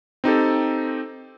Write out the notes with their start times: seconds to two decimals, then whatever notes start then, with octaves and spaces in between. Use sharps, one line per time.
0.24 C4 D#4 G4 A4